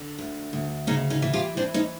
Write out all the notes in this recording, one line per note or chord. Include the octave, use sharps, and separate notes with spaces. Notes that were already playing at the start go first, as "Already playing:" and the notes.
Already playing: D3
D2
D2
C#3 C#4 D#4
C#4 D#4
E3
F4 G4
E3 C4 D4
C#4 D#4